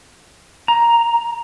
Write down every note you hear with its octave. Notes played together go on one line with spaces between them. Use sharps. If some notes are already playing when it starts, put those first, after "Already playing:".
A#5